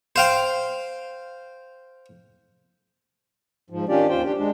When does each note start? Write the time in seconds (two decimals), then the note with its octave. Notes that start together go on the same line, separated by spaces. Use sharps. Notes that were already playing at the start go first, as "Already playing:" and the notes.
0.16 C5 F5 G5
3.70 G#2 F3
3.89 D#3 C#4 D4 F4 G4 D5
4.09 D#2 F4 C5 G5
4.23 D4 G4
4.38 G#3 D4